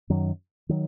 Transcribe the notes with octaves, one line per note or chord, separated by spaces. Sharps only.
F#2 D#3 F#3
D#3 F#3